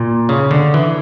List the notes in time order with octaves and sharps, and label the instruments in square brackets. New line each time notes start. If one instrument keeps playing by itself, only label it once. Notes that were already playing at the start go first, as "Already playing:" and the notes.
Already playing: [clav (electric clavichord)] A#2
C#3
D3
E3